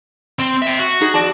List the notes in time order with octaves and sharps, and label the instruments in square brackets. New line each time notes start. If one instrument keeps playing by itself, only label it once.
[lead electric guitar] C4
E5 G5
F#4
[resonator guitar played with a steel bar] D#4 G#4 D#5
F2 D5 A5